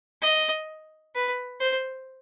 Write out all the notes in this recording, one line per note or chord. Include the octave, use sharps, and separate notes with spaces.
D#5
B4
C5